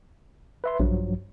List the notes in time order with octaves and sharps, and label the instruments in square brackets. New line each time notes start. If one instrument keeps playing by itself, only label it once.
[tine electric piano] B4 E5 C6
[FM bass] A#1 [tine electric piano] G2 F3 F#3